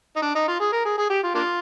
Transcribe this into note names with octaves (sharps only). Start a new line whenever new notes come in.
D#4
D4
D#4
F4
G#4
A#4
G#4
G#4
G4
F4
A#3 D4 F4